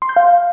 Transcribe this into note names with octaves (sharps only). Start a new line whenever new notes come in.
C6
G6
F5